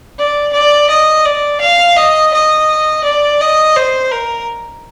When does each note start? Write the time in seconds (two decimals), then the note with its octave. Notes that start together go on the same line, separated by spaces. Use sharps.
0.18 D5
0.53 D5
0.89 D#5
1.25 D5
1.61 F5
1.96 D#5
2.33 D#5
3.04 D5
3.41 D#5
3.76 C5
4.12 A#4